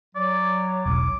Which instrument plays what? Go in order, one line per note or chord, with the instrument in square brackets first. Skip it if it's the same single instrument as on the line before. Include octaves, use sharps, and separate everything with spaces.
[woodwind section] F#3 C#5 [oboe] D5
[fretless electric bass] E1 B1 [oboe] D6